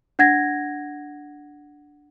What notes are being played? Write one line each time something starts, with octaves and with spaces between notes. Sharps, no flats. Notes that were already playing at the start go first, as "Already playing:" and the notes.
D4 F#5 G#6 A#6